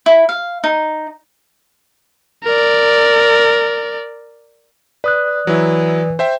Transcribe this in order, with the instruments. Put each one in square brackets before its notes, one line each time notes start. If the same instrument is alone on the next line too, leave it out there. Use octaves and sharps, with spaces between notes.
[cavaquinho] E4
F5
D#4
[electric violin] A#4 D5
[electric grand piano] B4 [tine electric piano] D5 D#6 F#6
[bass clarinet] E3 [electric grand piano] F#3 E4
[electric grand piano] C5 E5 G5